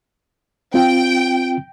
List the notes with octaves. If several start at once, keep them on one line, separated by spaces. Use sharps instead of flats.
C4 F4 G5